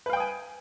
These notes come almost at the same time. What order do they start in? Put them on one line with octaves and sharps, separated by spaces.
B4 F5 G5 D#6 G#5